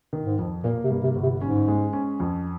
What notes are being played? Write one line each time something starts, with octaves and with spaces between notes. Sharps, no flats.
D#3
G#2
F2
A#2 A#3
C3
G2
C3
G1
C3
G#2 C#4
G#3
C#4
F2